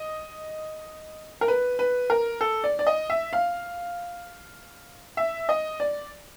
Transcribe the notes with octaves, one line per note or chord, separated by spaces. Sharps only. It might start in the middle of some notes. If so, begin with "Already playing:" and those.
Already playing: D#5
A#4
B4
B4
A#4
A4
D5
D5
D#5
E5
F5
E5
D#5
D5